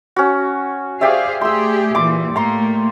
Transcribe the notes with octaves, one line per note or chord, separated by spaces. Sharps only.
C#4 F#4
G4 G#4 C5 D5 E5 F5
A3 G4 G#4 C6 E6
A#2 E3 C6 D6
A2 A3 A#3 A#5 C6